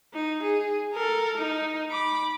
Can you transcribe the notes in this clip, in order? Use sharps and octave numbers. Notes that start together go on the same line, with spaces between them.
D#4
G#4
A4 A#4
D#4
B5 D6